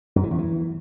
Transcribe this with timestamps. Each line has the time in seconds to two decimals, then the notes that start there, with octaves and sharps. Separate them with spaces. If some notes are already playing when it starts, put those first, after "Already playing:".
0.16 F#2
0.23 E3
0.31 E2
0.38 E3